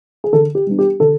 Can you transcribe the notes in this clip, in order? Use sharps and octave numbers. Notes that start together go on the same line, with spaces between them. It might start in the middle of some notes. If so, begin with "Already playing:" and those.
G#4
D3 A4
G4
G3 B3 D4
G4
D3 A4